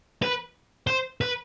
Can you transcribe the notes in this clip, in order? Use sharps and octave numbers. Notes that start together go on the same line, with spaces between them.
B4
C5
B4